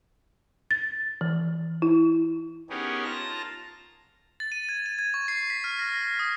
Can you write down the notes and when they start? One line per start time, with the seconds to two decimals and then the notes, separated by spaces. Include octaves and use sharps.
0.71 A6
1.21 E3
1.82 E4
2.70 B3 C#4 D#4 G4 G#4 A#4
3.04 F4 A5 A#5 A#6
4.40 A6
4.52 D#7
4.69 G#6
4.86 D#7
4.99 G#6
5.14 C#6
5.28 C7
5.50 B6
5.64 F6
5.79 A#6
5.93 A#6
6.19 D#6